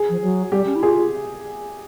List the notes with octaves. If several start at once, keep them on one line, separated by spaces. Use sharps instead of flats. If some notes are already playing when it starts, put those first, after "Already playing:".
Already playing: G#4
F3
F#3
G3 G4
C#4
E4
F4 G#4